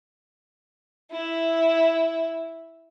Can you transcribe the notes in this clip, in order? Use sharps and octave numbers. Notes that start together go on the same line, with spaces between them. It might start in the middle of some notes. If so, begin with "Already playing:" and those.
E4 E5